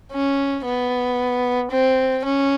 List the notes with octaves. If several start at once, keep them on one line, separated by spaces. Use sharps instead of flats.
C#4
B3
C4
C#4